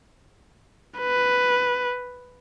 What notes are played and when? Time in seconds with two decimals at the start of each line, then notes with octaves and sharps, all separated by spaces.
0.99 B4